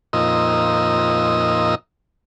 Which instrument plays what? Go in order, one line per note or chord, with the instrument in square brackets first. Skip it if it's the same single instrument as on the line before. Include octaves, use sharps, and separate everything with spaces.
[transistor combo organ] F2 A#2 D#4 D#5 E6